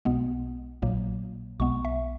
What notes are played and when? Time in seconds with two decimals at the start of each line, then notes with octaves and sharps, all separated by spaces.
0.05 B1 B2 G#3 B3
0.82 A#1 A#2 F#3 A#3
1.60 B1 B2 G#3 B3 C#6
1.85 E5